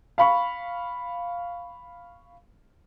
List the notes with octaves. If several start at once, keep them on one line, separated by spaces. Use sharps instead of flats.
F5 B5 C#6